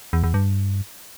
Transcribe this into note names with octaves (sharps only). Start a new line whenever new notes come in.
E2
E2
G2